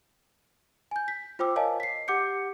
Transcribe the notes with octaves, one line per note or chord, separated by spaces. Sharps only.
G#5 G6
B6
F4 C5 G5 D6 E6
A#4 C#5 D#5 F5 G#5 A5
B6 C7
G4 F#5 D6 G6 C#7